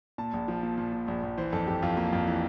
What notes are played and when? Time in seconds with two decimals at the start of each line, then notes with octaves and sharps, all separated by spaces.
0.18 A#2 A5
0.33 A#1
0.48 F3
0.63 A#2
0.78 A#2
0.93 A#2
1.08 A#1
1.23 A#1
1.38 E3 C5
1.53 F2 A4
1.67 F2 G4
1.82 F2 F4
1.97 A#3 F4
2.13 F2
2.27 E3